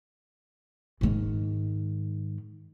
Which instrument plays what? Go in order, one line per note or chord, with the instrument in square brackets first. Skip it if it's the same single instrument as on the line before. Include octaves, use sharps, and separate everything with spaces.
[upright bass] G#2 D#3